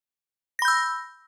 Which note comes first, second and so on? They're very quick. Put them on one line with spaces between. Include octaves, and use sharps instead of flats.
A#6 B5 G6 E6